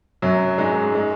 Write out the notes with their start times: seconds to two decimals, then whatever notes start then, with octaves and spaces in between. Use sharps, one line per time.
0.22 F#2 F#3
0.58 G#2 G#3
0.95 G#3